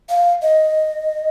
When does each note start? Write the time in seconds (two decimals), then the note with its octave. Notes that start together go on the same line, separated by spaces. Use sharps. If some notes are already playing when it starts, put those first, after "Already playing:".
0.09 F5
0.42 D#5